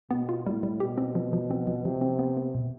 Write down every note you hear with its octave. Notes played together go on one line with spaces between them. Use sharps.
B2 B3
F4
A2 G3
G3
B2 G4
C4
F3
F3
C4
F3
C3 F3
C4
B3
B3
B2